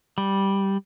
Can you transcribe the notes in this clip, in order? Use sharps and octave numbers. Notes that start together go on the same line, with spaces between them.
G3